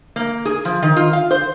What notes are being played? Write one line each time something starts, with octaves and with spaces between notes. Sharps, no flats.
A#3
G#4
F3
D#3
F4
F5
C5